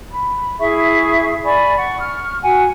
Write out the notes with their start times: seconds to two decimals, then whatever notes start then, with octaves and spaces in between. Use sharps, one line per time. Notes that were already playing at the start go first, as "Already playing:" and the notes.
0.13 B5
0.59 E4 G#4 E5 C#6
1.44 D5 G#5 B5 C#6
1.77 F#5 C#6
2.01 C#6 F6
2.43 F#4 F#5 G#5